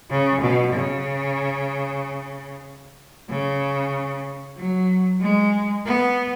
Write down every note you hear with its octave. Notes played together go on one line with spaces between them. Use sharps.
C#3
B2
C#3
C#3
F#3
G#3
B3